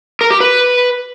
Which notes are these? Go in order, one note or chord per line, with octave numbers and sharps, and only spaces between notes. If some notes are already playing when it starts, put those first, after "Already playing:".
A#4
G4
B4